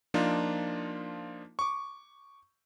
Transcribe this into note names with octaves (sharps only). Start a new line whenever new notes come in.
F3 A#3 D4 D#4 F4
C#6 D6